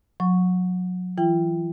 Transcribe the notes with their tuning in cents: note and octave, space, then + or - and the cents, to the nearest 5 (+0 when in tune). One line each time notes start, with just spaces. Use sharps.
F#3 -30 C#6 +0
E3 +0 F4 -45 G5 +0